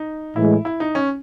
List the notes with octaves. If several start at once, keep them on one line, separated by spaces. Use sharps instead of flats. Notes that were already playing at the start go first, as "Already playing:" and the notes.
Already playing: D#4
A2 E3 G#3 E4
E4
D#4
C#4